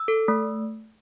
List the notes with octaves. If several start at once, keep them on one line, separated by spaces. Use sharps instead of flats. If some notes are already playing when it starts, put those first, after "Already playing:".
Already playing: E6
A4
A3